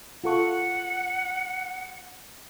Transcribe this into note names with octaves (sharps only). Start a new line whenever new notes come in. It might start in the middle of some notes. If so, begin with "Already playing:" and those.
F4 A4 F#5 C#6